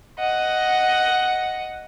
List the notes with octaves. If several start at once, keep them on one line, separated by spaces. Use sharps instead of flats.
D#5 F#5